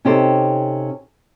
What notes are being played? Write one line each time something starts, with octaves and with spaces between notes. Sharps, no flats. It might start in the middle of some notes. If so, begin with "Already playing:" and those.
C3 C#4 D#4 G4 A4 C5